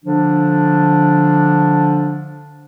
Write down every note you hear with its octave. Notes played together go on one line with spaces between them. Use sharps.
D3 F3 D4